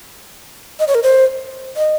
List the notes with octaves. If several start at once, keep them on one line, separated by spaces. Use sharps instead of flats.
D#5
C#5
A#4
C5
D#5